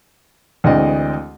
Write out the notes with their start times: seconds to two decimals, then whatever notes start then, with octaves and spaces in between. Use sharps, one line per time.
0.64 D2 E3 G#3 C4 D5 D#5